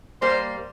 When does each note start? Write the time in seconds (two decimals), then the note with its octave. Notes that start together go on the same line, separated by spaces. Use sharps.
0.22 G3 A#3 C5